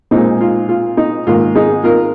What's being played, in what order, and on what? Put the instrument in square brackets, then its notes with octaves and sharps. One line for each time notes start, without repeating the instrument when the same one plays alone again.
[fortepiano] A#2 G#3 C4 D#4
F4
F4
D#4
G#2 D#3 A#3 F4
D#4 G#4
F4 A#4